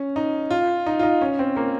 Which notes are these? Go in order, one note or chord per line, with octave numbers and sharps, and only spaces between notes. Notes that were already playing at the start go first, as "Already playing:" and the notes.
Already playing: C#4
D#4
F4
D#4
F4
D#4
C#4
C4
A#3